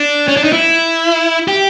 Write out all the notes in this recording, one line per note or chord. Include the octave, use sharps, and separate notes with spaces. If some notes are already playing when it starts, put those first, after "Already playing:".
Already playing: D4
C#4
D4
D#4
E4
G4